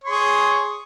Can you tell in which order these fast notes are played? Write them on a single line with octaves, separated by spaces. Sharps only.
C#5 C6 G#4